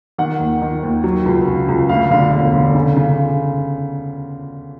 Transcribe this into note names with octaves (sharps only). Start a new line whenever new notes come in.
D#3 F#5
D#2
D#3
D#2
F#3
C#2
C#3
C#2
D2 F5
D3 F5
E1 F5
D3
C#3
C#3